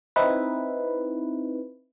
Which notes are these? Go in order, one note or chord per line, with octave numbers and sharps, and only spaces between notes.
C4 D#4 E4 B4